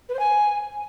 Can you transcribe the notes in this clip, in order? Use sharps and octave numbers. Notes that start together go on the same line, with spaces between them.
B4
C5
G#5